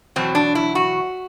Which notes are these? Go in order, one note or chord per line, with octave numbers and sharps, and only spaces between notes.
E2 B2 F#3 C4
D4
E4
F#4